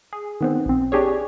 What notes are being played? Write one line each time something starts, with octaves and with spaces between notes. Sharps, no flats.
G#4
D#3 B3 C4
A#1 C4
D4 G4 G#4 C#5